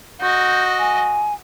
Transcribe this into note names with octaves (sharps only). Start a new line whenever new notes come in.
F#4 D#5 G6
G#5